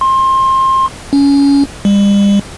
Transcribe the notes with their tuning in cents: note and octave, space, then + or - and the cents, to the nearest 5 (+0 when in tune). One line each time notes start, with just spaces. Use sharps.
C6 +25
C#4 +20
G3 +40